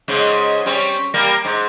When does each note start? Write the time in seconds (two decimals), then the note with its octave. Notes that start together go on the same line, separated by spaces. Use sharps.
0.08 G#2 C#3 G#3
0.66 G3 C4 C#4
1.14 G3 A#3 A#4
1.45 G#2